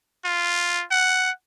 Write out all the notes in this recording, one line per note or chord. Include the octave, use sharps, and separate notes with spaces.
F4
F#5